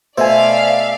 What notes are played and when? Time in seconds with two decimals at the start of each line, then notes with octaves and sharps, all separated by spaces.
0.18 B2 A3 C5 D5 E5 F5 G#5